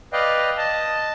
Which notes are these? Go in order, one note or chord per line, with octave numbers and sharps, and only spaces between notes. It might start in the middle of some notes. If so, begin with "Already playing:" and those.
B4 D5 D#5 F5 G5
D#5 A5